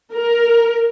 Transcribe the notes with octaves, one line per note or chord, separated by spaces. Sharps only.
A#4